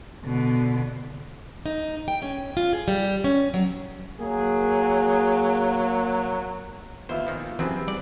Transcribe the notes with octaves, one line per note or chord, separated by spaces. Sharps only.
B2 D3
D#4
G5
C#4
F4
G#4
G3
C#4
F#3
F#3 A#3 G#4
D#2 F3 B3 E4 F4 C5
A#2 D#3 F3
F#2 C3 E3 C4 G#4 B4
G#2 G3 D5